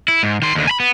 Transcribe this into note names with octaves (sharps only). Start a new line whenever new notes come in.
E4
G#2
D#3 C6
D#2 D3
G#5 B5
B3